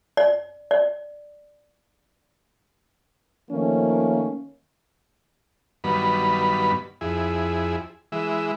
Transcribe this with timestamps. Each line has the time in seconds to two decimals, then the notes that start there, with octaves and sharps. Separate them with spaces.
0.17 D5
0.71 D5
3.50 D#3 F3 A3 A#3 C#4
5.84 G2 D#3 F#3 B3 B5
7.01 F2 E4 G#4
8.12 E3 G#3 E5